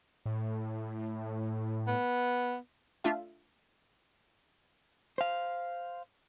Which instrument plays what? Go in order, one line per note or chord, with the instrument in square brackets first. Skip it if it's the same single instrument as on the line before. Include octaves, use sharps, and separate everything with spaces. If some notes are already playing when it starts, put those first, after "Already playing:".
[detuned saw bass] A2
[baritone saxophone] B3
[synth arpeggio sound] A3 D4 F4 E5
[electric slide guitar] C5 F5